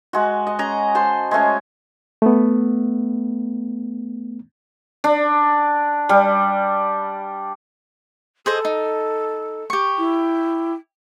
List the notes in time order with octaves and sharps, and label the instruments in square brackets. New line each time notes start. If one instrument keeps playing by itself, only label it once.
[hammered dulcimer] G#3 F#4
D#5
C#4 G#4 D#5 A#5
C5 A5 C6
G#3 A3 C#4 C#5
[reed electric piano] A3 B3
[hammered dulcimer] D4
G3
[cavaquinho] G#4 C5 D#5 [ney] A4
[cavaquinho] D#4
G4 C#6
[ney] E4